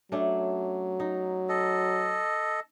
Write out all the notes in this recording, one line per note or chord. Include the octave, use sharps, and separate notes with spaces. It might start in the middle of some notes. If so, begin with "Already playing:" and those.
F#3 A3 C#4 D4
D#4
A4 D#5